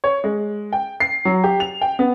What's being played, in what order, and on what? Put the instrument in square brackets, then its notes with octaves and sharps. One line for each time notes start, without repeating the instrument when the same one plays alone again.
[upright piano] C#5
G#3
G5
C7
F#3
G4
F7
G5
B3